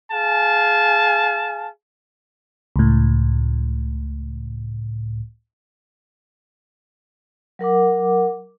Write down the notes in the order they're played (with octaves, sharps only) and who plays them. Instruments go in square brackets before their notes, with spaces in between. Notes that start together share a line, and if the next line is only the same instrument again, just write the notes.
[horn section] G#4 F5 G#5 A5
[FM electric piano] C#2 A2
[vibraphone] F#3 A#4 F#5 D6